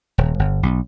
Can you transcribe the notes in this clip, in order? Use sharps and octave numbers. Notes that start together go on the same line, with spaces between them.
D#1
G1
B1